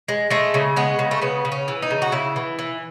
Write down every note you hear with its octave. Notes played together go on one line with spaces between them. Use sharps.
G#3
G#3 A3
C#3
G#3 B3
C#3
A3
C#3 B3
C#3
C#4
E3
D#4
C#3
F#4
C#3 E4
E3
E3